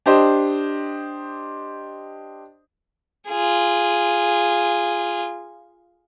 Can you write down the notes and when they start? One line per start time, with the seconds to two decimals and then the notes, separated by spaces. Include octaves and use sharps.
0.06 D4 G4 C5 D#5
3.28 F4 G#4